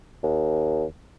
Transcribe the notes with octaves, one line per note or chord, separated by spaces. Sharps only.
D#2